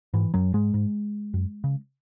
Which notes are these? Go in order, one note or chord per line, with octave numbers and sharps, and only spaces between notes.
G#2 E3
F#2 F#3
G#2 G#3
G#2
F#2
C#3